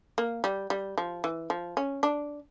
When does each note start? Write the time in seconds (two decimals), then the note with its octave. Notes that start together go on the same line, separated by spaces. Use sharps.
0.18 A#3
0.44 G3
0.70 G3
0.98 F3
1.24 E3
1.50 F3
1.77 C#4
2.03 D4